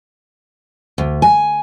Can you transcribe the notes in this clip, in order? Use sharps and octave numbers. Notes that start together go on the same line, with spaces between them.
D2
G#5